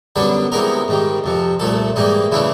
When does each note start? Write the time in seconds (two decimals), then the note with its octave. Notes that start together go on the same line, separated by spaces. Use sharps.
0.16 F#2 D3 G3 B3 D4 B4
0.52 C3 E3 G#3 B3 D#4 A#4
0.88 G#2 D#3 G3
1.24 F2 C3 F3
1.60 C2 A#2 F3 A3 A4
1.96 G#2 E3 G3 A#3 D#4
2.32 C#3 E3 A3 D4 E4